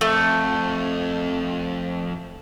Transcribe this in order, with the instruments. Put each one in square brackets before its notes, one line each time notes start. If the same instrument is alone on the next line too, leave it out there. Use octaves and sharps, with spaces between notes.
[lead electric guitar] F2 [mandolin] A3